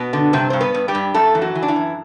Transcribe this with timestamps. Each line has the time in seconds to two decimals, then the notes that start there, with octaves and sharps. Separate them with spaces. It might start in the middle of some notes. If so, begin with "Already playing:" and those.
Already playing: B2 B3
0.13 D3
0.33 G2 C3 C4
0.50 G2 C5
0.61 B3 B4
0.74 G2
0.88 G3 G4
0.95 G2
1.14 F#2 A3 A4
1.35 E3
1.42 F#3 F#4
1.55 E3
1.62 D4
1.68 E3 E4
1.76 F#2